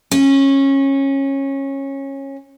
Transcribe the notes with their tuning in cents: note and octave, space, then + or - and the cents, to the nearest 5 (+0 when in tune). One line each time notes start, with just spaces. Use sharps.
C#4 -20